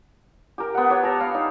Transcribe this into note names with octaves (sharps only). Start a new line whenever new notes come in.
G4 A#4
B3 F#5
G4 C#5
A4 A#5
F5 B5
D#4